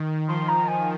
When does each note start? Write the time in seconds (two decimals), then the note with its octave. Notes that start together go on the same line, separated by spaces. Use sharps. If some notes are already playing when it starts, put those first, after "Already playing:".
Already playing: D#3
0.28 F3 C6
0.48 A#5
0.67 G#5